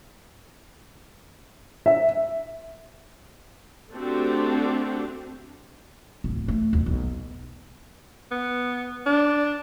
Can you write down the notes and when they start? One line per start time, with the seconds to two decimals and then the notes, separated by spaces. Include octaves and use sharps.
1.86 E5
3.94 A3 C4 D4 F#4 G4 A4
6.24 D1
6.48 A3
6.73 D#2
6.86 B1
8.31 B3
9.06 D4